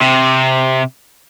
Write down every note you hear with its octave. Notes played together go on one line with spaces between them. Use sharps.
C3